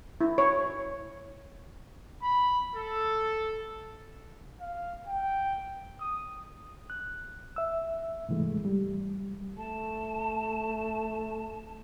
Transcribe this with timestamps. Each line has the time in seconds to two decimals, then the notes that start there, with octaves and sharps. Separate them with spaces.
0.21 E4
0.38 C#5
2.22 B5
2.75 A4
4.61 F5
5.07 G5
6.00 D#6
6.90 F#6
7.56 E5 E6
8.29 G#2 C3 E3 G#3 A3
8.65 G3
9.57 A3 A5